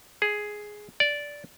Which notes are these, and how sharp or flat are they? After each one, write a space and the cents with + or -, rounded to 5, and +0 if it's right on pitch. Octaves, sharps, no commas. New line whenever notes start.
G#4 +5
D5 -10